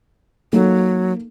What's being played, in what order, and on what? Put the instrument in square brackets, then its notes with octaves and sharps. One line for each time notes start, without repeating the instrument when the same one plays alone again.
[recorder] F#3 [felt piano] A#3 D#4 A4